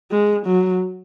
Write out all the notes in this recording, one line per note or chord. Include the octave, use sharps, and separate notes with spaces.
G#3
F#3